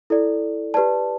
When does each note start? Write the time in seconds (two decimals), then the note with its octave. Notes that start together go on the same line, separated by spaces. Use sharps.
0.10 E4 A4 D5
0.74 G4 B4 D5 A5